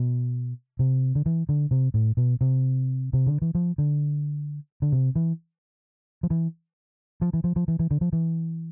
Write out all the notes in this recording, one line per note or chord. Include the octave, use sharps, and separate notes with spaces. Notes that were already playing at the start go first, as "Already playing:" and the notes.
Already playing: B2
C3
D3
E3
D3
C3
A2
B2
C3
C3
D3
E3
F3
D3
D3
C3
E3
F3
E3
F3
E3
F3
F3
E3
E3
D3
F3
E3